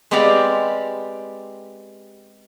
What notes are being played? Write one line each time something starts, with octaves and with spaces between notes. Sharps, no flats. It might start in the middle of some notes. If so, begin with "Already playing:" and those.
G#3 B3 C4 G4 D5 F5